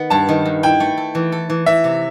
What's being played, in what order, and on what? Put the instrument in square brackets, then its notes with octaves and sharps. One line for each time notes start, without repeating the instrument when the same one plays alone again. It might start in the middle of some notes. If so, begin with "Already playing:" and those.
Already playing: [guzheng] D#3 B3
[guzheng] G2 [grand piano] A5
[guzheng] D#3
G2
[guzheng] E4 [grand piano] G5
[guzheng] A3
A4
E3
A4
E3
[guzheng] E3 [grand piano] E5
[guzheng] C3